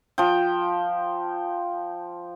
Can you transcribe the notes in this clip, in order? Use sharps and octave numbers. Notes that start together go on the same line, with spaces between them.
F3 G5